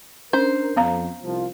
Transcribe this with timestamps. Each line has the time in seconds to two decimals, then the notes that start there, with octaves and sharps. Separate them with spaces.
0.33 C#4 D4 A#4 C5
0.77 F2 B3 F5 A#5
1.22 C2 F3